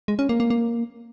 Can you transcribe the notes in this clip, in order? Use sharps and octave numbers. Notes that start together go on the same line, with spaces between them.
G#3
C#4
A#3
A#3
A#3